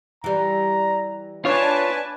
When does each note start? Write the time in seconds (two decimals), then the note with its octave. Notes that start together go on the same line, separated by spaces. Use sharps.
0.24 E3 G3 A#5
1.45 D4 F4 B4 C#5 G#5 A5